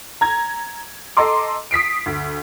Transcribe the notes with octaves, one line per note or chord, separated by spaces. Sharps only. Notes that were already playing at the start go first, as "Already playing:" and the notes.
A#5 G#6
A4 D#5 A#5 C6 D6
D#6 B6 C7 D7
D2